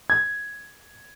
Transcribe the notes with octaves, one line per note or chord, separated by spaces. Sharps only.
G#6